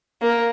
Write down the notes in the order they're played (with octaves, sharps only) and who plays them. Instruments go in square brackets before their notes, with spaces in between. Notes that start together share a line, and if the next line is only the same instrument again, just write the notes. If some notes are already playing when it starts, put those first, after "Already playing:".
[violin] A#3